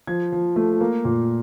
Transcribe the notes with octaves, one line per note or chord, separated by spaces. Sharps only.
F3 G#6
F3
A3
A#3
A#2